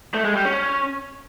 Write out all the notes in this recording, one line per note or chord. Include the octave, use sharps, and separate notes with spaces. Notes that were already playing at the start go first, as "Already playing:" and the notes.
A3
G#3
G3
C#4